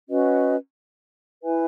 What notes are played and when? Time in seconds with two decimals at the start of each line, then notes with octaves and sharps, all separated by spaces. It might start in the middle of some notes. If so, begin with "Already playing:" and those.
0.08 C#4 F#4 B4 D#5
1.44 E4 B4 E5 G#5